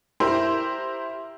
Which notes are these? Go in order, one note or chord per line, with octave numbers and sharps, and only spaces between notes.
E4 G4 A#4 C5